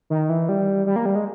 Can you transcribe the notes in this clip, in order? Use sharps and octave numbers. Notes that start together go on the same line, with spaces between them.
D#3
E3
G3
G3
A#3
G3
G#3